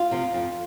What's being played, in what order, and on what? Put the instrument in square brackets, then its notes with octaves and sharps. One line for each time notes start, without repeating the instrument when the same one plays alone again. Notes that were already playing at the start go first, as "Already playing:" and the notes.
Already playing: [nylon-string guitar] F4
C3 F3
F2